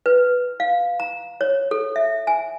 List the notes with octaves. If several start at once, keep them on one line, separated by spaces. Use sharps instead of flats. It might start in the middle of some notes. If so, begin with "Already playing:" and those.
B4
F5
A#5
C#5
A4
E5
G#5